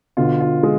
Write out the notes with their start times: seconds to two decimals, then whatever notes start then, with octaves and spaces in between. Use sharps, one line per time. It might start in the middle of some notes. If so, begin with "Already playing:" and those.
0.17 B2 D3 F4
0.40 F4
0.63 G#3